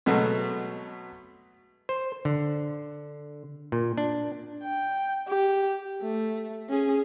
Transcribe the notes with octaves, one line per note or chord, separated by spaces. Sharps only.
B2 F#3 G#3 A3 B3
C5
D3
A#2
D4
G5
G4
A3
C#4 G#4